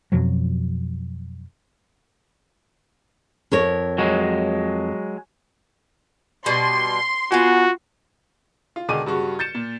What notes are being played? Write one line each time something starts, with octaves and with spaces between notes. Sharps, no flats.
F2 B2 F3 F#3
F2 A#4 C#5
F#3 G#3
B2 G3 C6
B3 F4 F#4 F#5 G#5
F4
E1 D3 D#3 G#4 D6 D#7
G2 C#3 F#4 C#6
G6 A6 C#7 E7
A#2